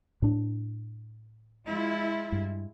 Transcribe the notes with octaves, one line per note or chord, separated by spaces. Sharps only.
A2 D4
G#3 E4 F4
G2